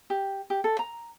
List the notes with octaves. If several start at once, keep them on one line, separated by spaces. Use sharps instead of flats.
G4
G4
A4
A#5